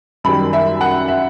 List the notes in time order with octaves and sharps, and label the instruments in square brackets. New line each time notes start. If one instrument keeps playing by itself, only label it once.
[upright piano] F#2 D#3 G3 B5
E5
F#5
E5